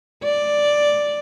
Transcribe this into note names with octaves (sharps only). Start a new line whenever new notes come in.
D5